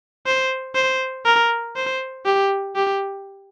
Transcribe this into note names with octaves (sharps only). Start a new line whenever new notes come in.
C5
C5
A#4
C5
G4
G4